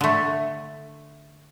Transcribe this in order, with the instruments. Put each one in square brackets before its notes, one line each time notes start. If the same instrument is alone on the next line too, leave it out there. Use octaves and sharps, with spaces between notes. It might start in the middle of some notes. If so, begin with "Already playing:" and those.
[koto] D3 A3